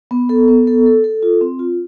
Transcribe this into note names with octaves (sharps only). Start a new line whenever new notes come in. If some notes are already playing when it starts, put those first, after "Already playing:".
B3
A4
B3
A4
A4
A4
F4
C4
F4